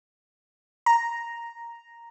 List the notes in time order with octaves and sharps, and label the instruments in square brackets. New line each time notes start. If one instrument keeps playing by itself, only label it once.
[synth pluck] A#5